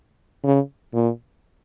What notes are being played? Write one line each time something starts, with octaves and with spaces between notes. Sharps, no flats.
C#3
A#2